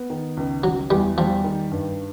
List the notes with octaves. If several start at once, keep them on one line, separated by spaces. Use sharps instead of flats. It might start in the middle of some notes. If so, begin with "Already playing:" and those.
Already playing: B3
D#3
C#2
C#2 F#3
E2 G3
F3 G3
D#3
G2